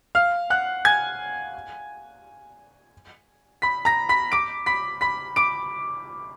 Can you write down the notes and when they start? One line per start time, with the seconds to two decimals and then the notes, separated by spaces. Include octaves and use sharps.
0.15 F5 F6
0.50 F#5 F#6
0.85 G#5 G#6
3.62 B5 B6
3.85 A#5 A#6
4.09 B5 B6
4.32 D6 D7
4.66 B5 B6
5.01 B5 B6
5.36 D6 D7